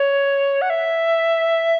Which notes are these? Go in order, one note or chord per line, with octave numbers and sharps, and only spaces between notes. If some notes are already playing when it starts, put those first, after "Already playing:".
Already playing: C#5
F#5
E5